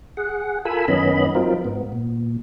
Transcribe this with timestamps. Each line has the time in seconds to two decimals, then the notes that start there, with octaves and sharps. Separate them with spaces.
0.17 G#4 F#5
0.65 F4 A4 A#4 G#5 B5 E6
0.88 F#2 D#3 B3 C#4 D#5 B5
1.35 F3 F#3 C4 D#4 F4 A#4
1.65 G#2 B3
1.92 A#2